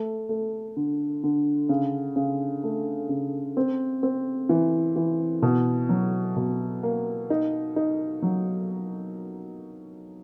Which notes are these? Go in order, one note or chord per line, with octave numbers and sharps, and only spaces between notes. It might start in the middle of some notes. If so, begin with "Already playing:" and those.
Already playing: A3
A3
D3
D3
C#3
C#3
A3
C#3
C4
C4
E3
E3
B2
F#3
B2
A#3
D#4
D#4
F#3